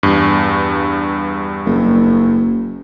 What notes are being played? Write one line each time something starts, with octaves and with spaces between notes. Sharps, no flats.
E2 G2
F#1